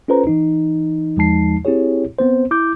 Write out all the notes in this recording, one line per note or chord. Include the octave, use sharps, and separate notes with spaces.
C#4 F4 A4 B4 C5 A#5
E3 D#4
E2 F3 G#3 D#4 A5 C7
C4 E4 G4 G#4 C#5
B3 C4 C5
E4 D6 G6